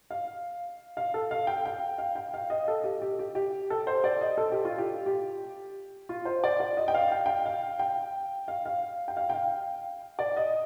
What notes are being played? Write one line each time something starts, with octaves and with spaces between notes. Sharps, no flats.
F5
F5
A4
F5
G5
G5
F5
G5
F5
D#5
A4
G4
G4
G4
G4
A4
C5
D5
D#5
A4
G4
F4
G4
G4
F4
C5
D5
D5
D#5
G5
F5
G5
G5
F5
G5
F5
F5
G5
F5
G5
F5
D5
D#5